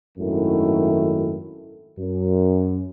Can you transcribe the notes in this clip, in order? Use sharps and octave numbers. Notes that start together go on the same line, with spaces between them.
G#1 F#2 D#3 A3 E4
F#2